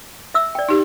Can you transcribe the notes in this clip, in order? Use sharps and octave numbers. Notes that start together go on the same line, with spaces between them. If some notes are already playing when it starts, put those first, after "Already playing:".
E5 E6
D5 G5
D#4 G4